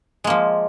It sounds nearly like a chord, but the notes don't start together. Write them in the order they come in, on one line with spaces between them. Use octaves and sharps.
G#3 A#3 F3